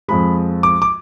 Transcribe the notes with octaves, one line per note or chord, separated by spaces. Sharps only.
F2 F3 G#3 B5
D6
D6